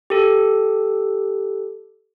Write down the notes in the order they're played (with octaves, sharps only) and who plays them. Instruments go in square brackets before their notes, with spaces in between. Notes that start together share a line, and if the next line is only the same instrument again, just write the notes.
[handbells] G4 A4